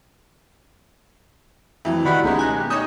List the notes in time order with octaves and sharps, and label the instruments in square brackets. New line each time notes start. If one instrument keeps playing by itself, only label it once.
[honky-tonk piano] F2 E3 F#3
[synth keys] D#3 E4 [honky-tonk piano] F#4 G4 D5 [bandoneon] F#5 B5
[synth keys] C#2 [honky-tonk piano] B2 A3 C#4 [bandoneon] G#3 D#4
[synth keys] G#5 F#6 A#6
[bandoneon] G4
[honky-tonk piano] D#4 C#5 D#6 [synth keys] E5 C#6 G6